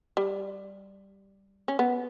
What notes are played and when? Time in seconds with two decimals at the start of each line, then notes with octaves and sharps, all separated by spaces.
0.17 G3
1.68 C#4
1.79 B3